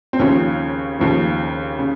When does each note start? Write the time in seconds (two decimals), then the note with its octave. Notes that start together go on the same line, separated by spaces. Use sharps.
0.13 C4
0.19 D#2 C#3 F3 C#4
0.99 D#2 C#3 F3
1.79 C#3